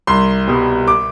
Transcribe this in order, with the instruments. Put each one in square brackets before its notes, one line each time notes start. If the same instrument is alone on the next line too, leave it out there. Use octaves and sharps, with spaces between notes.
[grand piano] C2 C6
B2 G3
D6